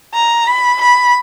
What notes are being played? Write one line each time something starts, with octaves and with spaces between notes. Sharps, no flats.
A#5
B5
B5